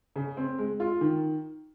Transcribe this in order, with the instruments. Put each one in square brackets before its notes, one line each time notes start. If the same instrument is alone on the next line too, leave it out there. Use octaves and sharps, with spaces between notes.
[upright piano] C#3
C4
G#3
F4
D#3